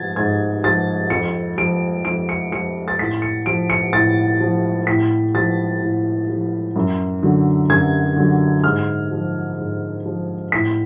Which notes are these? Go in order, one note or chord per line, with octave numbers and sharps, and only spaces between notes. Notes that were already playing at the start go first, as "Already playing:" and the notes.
Already playing: G#2 F3 G#6 A6
G#2 G#6
F3 A6
F2 C#7
F3 D7
F2 D7
C#7
F3 C#7
A6
A2 B6
C#7
F3 D7
C#7
A2 A6
F3
A2 B6
F3 A6
A2
F3
F#2
D3 F#3
F#2 G#6
D3 F#3
G#2 F6
F3
G#2
F3
A2 B6